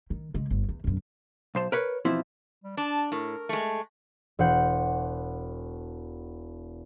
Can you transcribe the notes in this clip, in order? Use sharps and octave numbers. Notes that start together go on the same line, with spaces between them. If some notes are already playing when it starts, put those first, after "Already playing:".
D#3
C#3 G#3
G1
E2
E1 F#2
B1 C5 A5
A#4 B4 C#5
B2 E3 F3 C4 E4
G3
D4 A5
A2 A#4
G#3 A3
E1 C5 F#5 G6